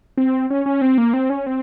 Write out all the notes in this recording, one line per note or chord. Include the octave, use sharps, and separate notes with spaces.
C4
C#4
C#4
C4
A#3
C4
C#4
C4